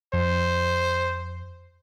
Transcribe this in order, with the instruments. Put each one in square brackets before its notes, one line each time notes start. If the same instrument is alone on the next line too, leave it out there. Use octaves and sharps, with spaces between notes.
[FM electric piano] F2 [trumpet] C5